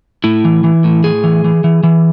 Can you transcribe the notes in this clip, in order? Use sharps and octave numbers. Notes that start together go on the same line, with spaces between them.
A2 E4
E3
E3
A2
A2 G#4
E3
E3
E3
E3